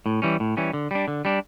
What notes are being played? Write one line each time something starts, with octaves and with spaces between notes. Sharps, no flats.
A2
E3 G3 C#4
A2
E3 G3 C#4
D3
G3 D4
D3
G3 D4